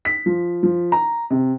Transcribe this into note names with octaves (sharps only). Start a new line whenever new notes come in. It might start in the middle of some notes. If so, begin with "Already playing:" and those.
B6
F3
F3
A#5
C3